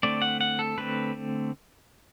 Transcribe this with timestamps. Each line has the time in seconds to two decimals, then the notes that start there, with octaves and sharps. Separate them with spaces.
0.03 D3 A3 C4 D5
0.22 F#5
0.41 F#5
0.59 A4
0.78 D3 A3 C4 B4